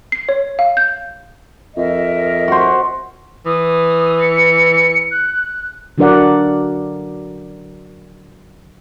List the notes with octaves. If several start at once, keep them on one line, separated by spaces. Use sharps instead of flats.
C7
C#5
F5
G6
F2 A#4 D#5 E5
F#4 C5
E3 D#6
C#7
F#6
D3 F#3 D4 A#4 D5 F#5